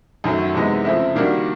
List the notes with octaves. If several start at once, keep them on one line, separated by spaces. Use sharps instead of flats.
F#2 D#3 F#3 A3
C3 E3 G#3 B3 D#4
C#3 F3 A3 C4 E4
D#3 G3 A#3 D4 F#4